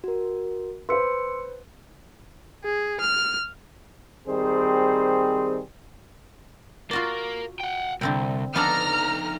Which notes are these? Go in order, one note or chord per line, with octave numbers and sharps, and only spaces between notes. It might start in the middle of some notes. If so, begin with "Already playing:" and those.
F#4 A#4
B4 C5 C6 E6 C#7
G#4
F6
D#3 G3 C4 G#4 C5
A#3 F4 F#4 D5
F#5 G5
C2 D3 C4 G5
F3 B3 D4 D#4 A4 A#5 F6